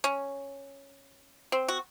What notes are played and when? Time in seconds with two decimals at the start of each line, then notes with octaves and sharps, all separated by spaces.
0.04 C#4
1.52 C4
1.68 F#4